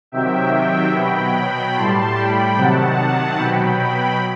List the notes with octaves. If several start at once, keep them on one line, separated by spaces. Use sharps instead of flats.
C3 D#3 F#3 E5 G5
E5 G5
B2 F#3 G5 B5
A2 G3 A5 C6
G5 B5
C3 D#3 F#3 F#5 A5
B2 F#3 G5 B5
G5 B5